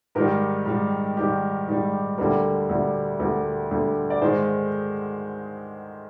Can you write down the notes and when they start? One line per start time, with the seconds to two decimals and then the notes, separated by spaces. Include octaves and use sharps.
0.15 G#2 D#3 G3 G4 A#4
0.66 G#2 D#3 G3
1.17 G#2 D#3 G3 G4
1.68 G#2 D#3 G3
2.18 D2 D3 G3 G4 A#4
2.70 D2 D3 G3
3.19 D2 D3 G3 G4 A#4
3.71 D2 D3 G3
4.10 D5
4.21 G#2 D#3 G#3 G#4 C5